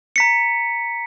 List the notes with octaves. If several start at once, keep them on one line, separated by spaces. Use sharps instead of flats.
A#5 B6 C#7